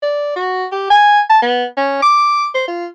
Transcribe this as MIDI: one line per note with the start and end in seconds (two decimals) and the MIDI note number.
0.02 0.32 74
0.36 0.66 66
0.72 0.86 67
0.91 1.20 80
1.30 1.41 81
1.42 1.65 59
1.77 1.98 61
2.02 2.47 86
2.55 2.65 72
2.68 2.87 65